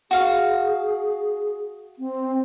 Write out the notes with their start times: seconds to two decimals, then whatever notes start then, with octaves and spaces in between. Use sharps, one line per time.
0.11 F#4 G#4 F5
1.99 C4